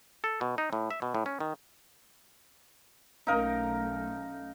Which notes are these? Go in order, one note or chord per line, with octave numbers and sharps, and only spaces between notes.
A4
B2
D#4
A2
E5
B2
A2
C#4
D#3
B1 A3 C#4 D#4 A#4 F5